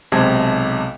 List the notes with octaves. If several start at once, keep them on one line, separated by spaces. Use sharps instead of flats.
B1 C3 G#3 A5 G#6